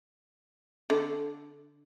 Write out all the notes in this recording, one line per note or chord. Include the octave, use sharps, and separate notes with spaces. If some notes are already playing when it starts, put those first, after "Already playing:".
D3